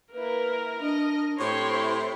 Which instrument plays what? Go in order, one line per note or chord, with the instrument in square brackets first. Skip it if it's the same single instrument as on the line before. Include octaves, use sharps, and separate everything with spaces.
[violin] A#3 E4 [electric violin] A#4 [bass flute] B4
[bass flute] D4 [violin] D#5
[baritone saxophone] A2 [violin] C4 E4 [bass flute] G4 [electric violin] C#5 C6